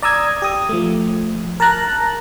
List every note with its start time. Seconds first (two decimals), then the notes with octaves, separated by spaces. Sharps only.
0.02 D5 A#5 D#6 E6 G#6
0.42 G4 D#6
0.69 F3 A3
1.60 A#4 A5 A#5 F#6